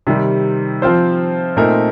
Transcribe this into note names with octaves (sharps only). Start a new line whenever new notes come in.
C3 D#3 G3
F3 C4 F4 C5
A#2 A3 C4 D#4 A#4